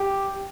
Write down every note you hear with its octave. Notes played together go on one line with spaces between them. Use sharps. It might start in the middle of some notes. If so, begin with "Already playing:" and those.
Already playing: G4